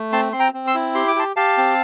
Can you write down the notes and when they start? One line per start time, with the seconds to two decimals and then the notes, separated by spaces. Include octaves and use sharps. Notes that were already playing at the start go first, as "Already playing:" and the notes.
Already playing: A3
0.12 C4 A5 C6
0.32 C4 C6
0.40 G5 A#5
0.54 C4
0.67 C6 E6
0.74 E4
0.95 G4 C6
1.08 D6
1.16 G4 A5 C6
1.36 G4 F5 A5
1.57 C4